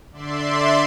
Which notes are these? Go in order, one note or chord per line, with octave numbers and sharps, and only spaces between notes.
D3 D5 E5 C6